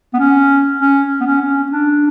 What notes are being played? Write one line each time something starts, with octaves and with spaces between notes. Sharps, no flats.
B3
C#4
C#4
B3
C#4
C#4
D4